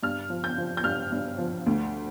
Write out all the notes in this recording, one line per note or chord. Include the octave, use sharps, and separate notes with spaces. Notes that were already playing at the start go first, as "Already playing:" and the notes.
G2 F6
F3
G6
F3
G6
G2 F6
G2
F3
D2